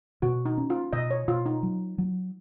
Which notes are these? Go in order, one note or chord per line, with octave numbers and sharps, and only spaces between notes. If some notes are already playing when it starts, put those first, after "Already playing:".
B2 F#4
D#4
C#4
F4
B2 D#5
C#5
B2 F4
D#4
F#3
F#3